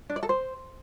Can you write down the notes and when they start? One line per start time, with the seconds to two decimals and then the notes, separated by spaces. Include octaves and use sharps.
0.10 D4
0.16 D5
0.23 A4
0.29 C5